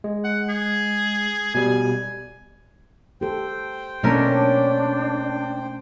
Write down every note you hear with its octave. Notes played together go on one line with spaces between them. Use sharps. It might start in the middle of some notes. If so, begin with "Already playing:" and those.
G#3
F#5
G#4
B2 G3 G#5
G4 A4 C5 G5
B2 A3 A#3 C#4 D4 A#4